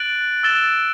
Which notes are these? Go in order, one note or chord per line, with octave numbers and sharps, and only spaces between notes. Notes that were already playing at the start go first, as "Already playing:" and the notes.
Already playing: F#6 A6 D7 F#7
E6 A6 E7 G7